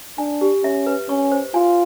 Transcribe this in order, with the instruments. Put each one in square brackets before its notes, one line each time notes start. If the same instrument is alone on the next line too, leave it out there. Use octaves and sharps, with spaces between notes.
[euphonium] D4 [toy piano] G#5
[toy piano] G4
[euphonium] C#4 [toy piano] E5
[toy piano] B4
[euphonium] C#4 [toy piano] C#6
[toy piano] C5
[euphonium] F4 [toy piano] G#5